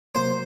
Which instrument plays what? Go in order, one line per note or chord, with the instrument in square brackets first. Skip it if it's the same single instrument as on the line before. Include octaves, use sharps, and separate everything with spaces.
[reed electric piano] C3 F#3 A#3 [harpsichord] C5